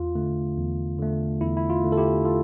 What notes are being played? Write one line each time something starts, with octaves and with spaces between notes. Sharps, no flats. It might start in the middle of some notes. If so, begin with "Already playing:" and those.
Already playing: E2 F4
D3 A3
E2
D3 A3
E2 E4
E4
F4
D3 A3
A4
E4 G4
F4 A4